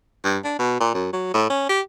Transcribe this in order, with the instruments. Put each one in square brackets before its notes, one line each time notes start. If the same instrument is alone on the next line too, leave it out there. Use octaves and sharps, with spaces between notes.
[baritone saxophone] G2
D4
B2
A#2
F#2
F#3
A2
C#4
G4